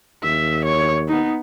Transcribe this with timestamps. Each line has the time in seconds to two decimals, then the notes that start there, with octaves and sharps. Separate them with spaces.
0.23 D#2 E5
0.65 C#5
1.08 B3 D#4